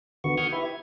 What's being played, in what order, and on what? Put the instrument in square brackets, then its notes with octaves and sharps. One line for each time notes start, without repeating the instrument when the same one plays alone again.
[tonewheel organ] D3 D#3 B3 F#4 C#6
F#5 C#6 D#6 F6 G6 G#6
E4 G4 B4 E5
G#6